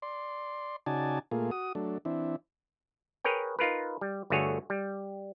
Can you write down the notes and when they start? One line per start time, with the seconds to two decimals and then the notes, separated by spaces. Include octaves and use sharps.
0.02 D5 C6
0.86 C#3 D#4 F#4 D5 G#5 A5
1.31 A#2 A3 A#3 F4 G#4
1.51 F#4 D#6
1.75 F#3 A3 D4
2.05 E3 C4 D4 E4
3.24 G#4 A#4 B4 C#5 G5
3.59 D#4 F4 A#4 B4
4.01 G3
4.30 G1 D3 A3 F#4 G#4 C#5
4.70 G3